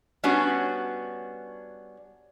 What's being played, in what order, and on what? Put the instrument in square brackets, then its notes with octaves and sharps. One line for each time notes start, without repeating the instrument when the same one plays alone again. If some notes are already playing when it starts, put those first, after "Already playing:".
[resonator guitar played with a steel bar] G3 B3 C#4 D4 F#4